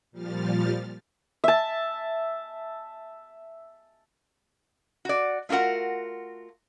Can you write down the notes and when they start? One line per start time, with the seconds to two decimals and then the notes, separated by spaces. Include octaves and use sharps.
0.11 A#2 F3 G3 F6 A6
1.44 E5 A5
5.05 F#4 D5
5.49 A3 F4 F#4 A#4 F#5